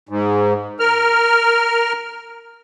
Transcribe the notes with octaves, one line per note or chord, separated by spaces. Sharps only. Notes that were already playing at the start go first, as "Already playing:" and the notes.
G#2
A#4 F6